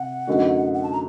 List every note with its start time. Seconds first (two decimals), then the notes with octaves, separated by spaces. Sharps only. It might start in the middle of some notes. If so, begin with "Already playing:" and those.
Already playing: C3 F#5
0.27 F#2 D3 A3 D#4 F#4
0.74 F#5
0.83 A5
0.93 A#5